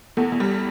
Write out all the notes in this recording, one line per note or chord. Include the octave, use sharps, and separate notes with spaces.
E2 A3
E2
G3